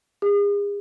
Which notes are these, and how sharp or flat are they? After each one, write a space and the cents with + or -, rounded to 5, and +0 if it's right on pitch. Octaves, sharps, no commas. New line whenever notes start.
G#4 -40